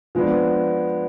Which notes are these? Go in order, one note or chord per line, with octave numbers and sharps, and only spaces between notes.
F3 G#3 B3 D4